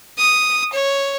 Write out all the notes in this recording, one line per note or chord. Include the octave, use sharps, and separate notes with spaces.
D#6
C#5